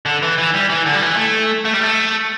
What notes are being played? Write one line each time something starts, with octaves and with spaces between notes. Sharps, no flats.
D3
E3
E3
G3
E3
D3
G3
E3
A3
A3
G3
A3